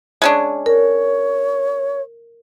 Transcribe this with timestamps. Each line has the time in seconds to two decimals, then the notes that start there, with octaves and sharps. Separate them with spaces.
0.22 G#3 C#4 D4
0.66 A#4 C#5